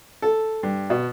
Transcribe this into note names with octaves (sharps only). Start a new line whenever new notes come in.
A4
G2
B2